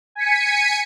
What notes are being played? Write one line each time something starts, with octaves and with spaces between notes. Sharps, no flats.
G#5 B6 C#7 D#7